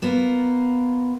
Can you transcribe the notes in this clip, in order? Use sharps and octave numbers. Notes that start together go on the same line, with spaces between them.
A#3 B3 F4 A#4